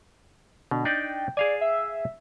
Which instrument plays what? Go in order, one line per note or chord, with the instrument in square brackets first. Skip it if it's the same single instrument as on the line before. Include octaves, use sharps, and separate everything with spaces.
[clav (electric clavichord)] B2 [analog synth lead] D3
[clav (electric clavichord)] D4 D#4 D5 [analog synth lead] G5
[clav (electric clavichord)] G#4 F5 G#5 [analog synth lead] D5
[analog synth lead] E5